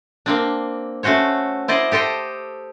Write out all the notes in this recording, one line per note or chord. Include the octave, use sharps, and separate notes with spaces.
A#3 C4 D4
A3 C#4 F#4 C5 C#5
E4 C5 D5 D#5
G4 A4 C5 D#5 G5